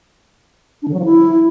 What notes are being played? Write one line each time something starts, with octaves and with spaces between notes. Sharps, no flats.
D4
D3
F#3
F3
E4